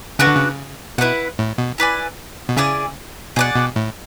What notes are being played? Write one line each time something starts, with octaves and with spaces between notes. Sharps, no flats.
C#3 D4 F#4 B4
D3
C#3
B2 E4 B4 F#5
A2
B2
E4 B4 D5 G#5
B2
C#3 E4 G#4 D5 G#5
B2 G#4 D5 F#5
B2
A2